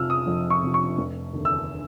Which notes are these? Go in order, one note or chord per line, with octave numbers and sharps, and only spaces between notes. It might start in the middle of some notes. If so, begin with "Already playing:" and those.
Already playing: F2 C3 F3 E6 F6
D#6
F2
C#6
C3 F3
C#6
F1
D#2 D3
E6